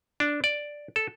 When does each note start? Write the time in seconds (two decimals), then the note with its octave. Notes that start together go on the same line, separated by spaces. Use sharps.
0.20 D4
0.44 D5
0.96 A4